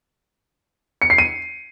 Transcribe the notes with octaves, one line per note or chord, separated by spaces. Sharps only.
C#7
C7
D#7